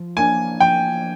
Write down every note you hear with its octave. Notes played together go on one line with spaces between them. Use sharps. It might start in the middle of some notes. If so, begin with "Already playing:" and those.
Already playing: F3
A#3 D4 G#5
F3 G5